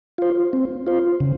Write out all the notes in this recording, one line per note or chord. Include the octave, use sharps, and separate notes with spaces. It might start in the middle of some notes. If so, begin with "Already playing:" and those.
F4 C5
C4
F4 C5
C#3